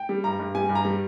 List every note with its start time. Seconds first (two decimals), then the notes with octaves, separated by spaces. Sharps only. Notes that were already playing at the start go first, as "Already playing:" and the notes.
Already playing: G5
0.09 G3
0.24 G2 A#5
0.39 G2
0.55 G3 G#5
0.69 G2
0.75 A#5
0.85 G3